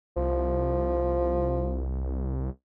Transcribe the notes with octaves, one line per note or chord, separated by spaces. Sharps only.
C2 F3